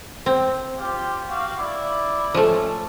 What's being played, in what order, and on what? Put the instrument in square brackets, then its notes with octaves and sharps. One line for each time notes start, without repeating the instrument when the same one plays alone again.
[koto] C4
[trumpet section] F4 G4
F#4 G4 F5
E4 D5
[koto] F3 A3 [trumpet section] C#4 A4